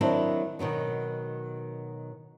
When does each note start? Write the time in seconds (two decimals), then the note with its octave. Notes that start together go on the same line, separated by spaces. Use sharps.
0.01 D#3 F#3 C4 D4 E4
0.59 B2 D#3 F#3 B3